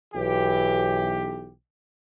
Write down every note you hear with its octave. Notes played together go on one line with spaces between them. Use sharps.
B1 E3 G4